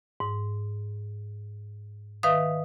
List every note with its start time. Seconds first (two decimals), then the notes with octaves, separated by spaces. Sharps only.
0.20 G#2
2.23 D#3 B4 E5 F5 D#6